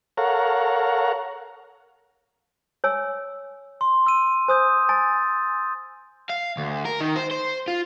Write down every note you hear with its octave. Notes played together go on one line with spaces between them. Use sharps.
A4 A#4 C#5 F5 F#5 A#5
C#5 G#5 E6
C6
E6 D#7
C5 G#5 D#6 G6
G#5 A6
F5
D2
A#4
D#3
C5
C5
F4